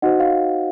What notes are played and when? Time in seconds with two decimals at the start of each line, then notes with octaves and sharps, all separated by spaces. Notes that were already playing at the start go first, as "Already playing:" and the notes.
0.02 D#4 F#4 C5 D#5 F#5
0.20 F5